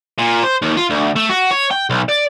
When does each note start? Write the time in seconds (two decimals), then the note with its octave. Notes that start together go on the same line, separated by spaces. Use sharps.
0.18 A#2
0.43 C5
0.62 D#2
0.77 F4
0.90 D2
1.16 A3
1.29 F#4
1.51 C#5
1.71 G5
1.90 B1
2.09 D5